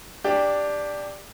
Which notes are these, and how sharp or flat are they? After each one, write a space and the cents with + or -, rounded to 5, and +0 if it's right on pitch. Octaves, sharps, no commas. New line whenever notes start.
D4 +0 G4 +15